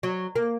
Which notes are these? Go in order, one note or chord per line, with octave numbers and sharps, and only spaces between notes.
F#3
A#3